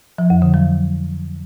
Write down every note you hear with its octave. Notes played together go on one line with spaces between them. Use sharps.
F3
F2
D3
F#3